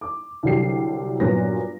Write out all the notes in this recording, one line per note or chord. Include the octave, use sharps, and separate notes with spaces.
D6
C2 D3 F#3 G4 C7
G2 A#2 F#3 B3 B4 A#6